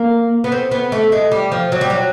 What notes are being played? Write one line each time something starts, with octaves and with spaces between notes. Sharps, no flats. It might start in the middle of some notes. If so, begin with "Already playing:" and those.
Already playing: A#3
B3
C4
B3
A3
G#3
G3
F3
F#3
G3
F#3